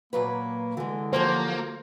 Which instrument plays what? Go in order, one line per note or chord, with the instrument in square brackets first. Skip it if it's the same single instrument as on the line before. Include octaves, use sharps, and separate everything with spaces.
[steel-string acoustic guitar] A#2 F#3 B4 [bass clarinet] A#3
[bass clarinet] D3 [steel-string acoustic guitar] E3 G#3
[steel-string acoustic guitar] F3 F#3 G4 [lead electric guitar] A#3 [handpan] C5